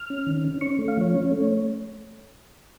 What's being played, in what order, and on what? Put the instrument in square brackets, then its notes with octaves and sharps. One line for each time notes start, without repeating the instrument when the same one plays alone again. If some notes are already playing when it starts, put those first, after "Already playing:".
Already playing: [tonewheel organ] F6
C#4
D#3
C#4
C#4 C#6
A3
F5
F3 C#5
C#4
A3